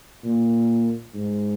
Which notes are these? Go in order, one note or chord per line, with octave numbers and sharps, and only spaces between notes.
A#2
G#2